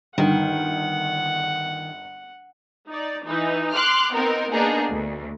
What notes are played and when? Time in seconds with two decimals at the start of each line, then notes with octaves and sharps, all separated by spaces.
0.18 G1 D#3 F#5
2.89 D#4 D5
3.24 E3 D#4
3.75 C6 D6 F6 F#6
4.14 B3 C4 D#4 A#4
4.52 A#3 B3 D4 D#4 G#4 A#4
4.90 D2